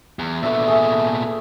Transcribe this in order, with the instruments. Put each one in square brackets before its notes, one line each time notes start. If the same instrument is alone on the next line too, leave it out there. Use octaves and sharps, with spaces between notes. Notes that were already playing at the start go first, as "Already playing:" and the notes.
[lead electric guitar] E2
[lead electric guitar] A#2 B3 [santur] A3 D4 E5
[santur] A3 G#4